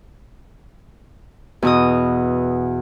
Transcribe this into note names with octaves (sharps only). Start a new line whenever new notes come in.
E2 B2 D#6